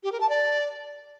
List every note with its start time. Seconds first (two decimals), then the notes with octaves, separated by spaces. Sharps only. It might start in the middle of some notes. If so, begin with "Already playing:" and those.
0.03 G4
0.12 A#4
0.21 A5
0.29 D5